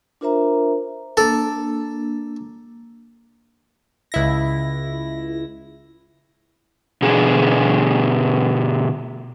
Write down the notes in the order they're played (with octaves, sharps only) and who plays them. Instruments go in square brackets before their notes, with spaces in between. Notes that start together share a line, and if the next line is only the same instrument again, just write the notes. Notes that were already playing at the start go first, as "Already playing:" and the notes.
[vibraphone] D4 F4 A#4 C5 E5 A#5
[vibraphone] A#3 D4 [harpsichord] A4
[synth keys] C#2 E4 A#6
[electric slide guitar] B2 D3 G#4